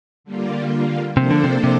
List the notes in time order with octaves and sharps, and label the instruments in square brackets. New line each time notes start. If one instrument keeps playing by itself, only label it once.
[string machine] D3 G3 A#3 F4
[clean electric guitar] C3 [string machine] F3 A#3 D4 A4 C5
[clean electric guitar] D3
C3
C3